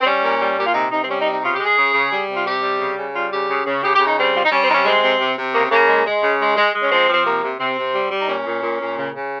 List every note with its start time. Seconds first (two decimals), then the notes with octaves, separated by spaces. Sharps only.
0.01 C4
0.06 G3 C#4
0.23 A#2
0.40 G3
0.58 A#2 G4
0.66 F4
0.74 C3 D#4
0.92 C3 D#4
1.03 C4
1.08 G3 C#4
1.19 D#4
1.26 C3
1.32 D#4
1.43 C#3 F4
1.54 G4
1.60 G#3
1.65 G#4
1.77 C#3
1.94 C#3
2.11 G3
2.29 C3
2.35 F4
2.45 C3 G4
2.62 G3
2.80 C#3
2.98 C#3
3.14 G3 F4
3.31 C#3 G4
3.49 C#3
3.66 C#3
3.83 C#3 G4
3.94 G4
3.99 C#3
4.06 D#4
4.17 G3 C4
4.34 G3 F4
4.44 D#4
4.51 G3 C#4
4.63 C4
4.68 C3 D#4
4.74 C#4
4.85 G#3 C4
5.03 C3
5.20 C3
5.37 C3
5.54 C#3 A#3
5.70 C#3 A#3
5.88 G#3
6.05 G#3
6.22 C#3
6.40 G#3
6.56 G#3
6.74 G#3
6.82 C#4
6.91 F3 C4
7.08 F3
7.13 C4
7.25 C3 A#3
7.43 C3
7.59 C3 C4
7.77 C3
7.94 G3
8.11 G3
8.19 D#4
8.27 A#2 C#4
8.46 A#2
8.62 A#2
8.80 A#2
8.96 C#3
9.14 C#3